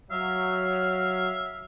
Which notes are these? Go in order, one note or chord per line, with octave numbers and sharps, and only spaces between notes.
F#3 E5 F5